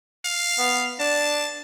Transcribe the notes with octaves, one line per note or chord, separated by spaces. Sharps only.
F5
B3
D4 A5